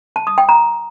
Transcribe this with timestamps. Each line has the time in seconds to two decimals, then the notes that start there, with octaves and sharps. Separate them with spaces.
0.16 A5
0.27 D#6
0.38 G5
0.49 A#5